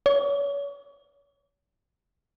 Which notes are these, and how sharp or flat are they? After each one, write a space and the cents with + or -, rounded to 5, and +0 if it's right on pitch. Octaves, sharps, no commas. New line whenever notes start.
C#5 +35